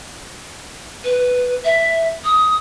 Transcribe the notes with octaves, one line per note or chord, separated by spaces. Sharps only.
B4
E5
D#6